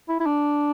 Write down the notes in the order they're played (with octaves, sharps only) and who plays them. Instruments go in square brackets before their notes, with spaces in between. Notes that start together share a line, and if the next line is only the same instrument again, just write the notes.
[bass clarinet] E4
E4
D4